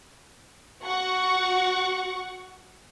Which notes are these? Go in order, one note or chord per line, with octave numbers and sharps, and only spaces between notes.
F#4 F#5 C#6